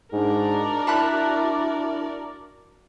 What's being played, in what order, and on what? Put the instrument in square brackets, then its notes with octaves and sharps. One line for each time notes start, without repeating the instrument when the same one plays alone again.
[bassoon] G#2 [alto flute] D4 [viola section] F#4 A#4 D5
[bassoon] E4 [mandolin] A5 B5 F#6